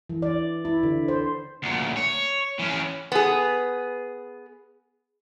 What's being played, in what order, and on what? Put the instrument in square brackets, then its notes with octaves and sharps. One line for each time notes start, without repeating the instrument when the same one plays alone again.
[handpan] E3
D5
E4
D3
C5
[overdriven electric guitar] D2 A#2
C#5
E3 C#4
[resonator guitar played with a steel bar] B3 G#4